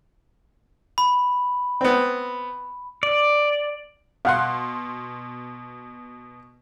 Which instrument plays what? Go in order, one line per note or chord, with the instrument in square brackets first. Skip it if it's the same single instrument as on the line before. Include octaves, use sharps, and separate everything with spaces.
[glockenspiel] B5
[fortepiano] B3 C4
[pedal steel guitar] D5
[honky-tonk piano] B2 C6 [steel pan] F5 F#5